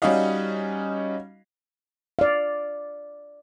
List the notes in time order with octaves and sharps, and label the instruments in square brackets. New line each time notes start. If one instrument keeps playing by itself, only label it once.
[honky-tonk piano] G3 C#4 D#4 F#4 D#5 F5
[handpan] D5 F5